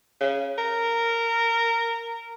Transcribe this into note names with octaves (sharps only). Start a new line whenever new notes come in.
C#3
A#4